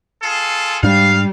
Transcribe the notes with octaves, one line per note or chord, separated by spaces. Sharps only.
F4 G#4 A4
G#2 G3 D4 F5